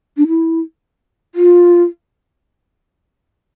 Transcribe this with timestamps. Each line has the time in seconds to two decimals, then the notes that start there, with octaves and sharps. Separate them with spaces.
0.17 D4
0.28 E4
1.35 F4